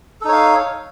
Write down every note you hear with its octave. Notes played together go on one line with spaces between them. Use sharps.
D#4 A4 C#5 F5